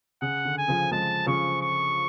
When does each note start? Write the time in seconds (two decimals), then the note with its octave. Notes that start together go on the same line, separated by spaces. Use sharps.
0.22 C#3 F#5
0.45 D3
0.58 G#5
0.68 C#3 F3
0.92 F3 G#3 A5
1.26 C#3 F3 C#6
1.61 C#6